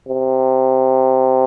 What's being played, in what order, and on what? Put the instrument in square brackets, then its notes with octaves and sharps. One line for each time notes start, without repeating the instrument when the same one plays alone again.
[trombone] C3